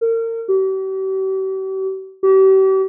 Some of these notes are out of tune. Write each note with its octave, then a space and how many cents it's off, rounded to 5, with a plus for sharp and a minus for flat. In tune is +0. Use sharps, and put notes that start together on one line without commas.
A#4 -35
G4 -45
G4 -40